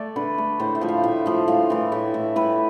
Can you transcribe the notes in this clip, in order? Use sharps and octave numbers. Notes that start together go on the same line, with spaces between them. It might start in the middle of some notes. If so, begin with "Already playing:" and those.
Already playing: A3 D5
D3 B4
A3
A2 C5
E5
F3 A3
F5
A2 E5
F3 A3
A2 F5
E3 A3
A2 E5
E3 A3
A2 B4